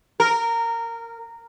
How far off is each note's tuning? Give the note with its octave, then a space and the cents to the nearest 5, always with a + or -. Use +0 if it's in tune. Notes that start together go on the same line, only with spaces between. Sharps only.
A#4 -15